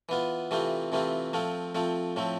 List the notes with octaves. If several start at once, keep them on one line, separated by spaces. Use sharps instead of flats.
E3 B3 F4
C3 E3 A3 C4 F4
C3 E3 A3 C4 F4
F3 A3 C4 F4
F3 A3 C4 F4
A2 F3 A3 C4